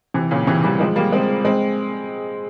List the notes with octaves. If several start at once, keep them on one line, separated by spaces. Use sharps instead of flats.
C3 E3
A#2 C#3
C3 E3
E3 G3
F3 G#3
G3 A#3
G#3 C4
G#3 C4